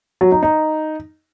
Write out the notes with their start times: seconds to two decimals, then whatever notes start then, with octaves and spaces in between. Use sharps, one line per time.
0.21 F#3
0.32 D#4
0.43 D#4